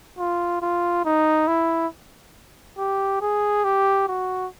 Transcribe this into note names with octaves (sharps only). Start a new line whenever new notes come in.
F4
F4
D#4
E4
G4
G#4
G4
F#4